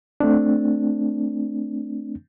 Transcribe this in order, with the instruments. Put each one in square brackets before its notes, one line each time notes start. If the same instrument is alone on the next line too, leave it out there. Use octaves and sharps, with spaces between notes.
[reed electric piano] A3 C4 D4